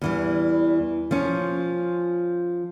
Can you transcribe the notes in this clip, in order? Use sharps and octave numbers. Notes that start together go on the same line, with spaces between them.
E2 E3 G3
F3 C#4